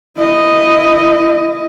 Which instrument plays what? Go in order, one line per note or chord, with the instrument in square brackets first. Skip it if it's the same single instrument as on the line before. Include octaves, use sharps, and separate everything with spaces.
[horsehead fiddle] E4 D#5